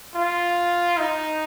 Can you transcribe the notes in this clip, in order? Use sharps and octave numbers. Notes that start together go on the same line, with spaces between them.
F4
D#4